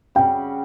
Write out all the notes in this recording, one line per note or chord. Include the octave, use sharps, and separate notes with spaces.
C#3 G3 C#4 F#4 G5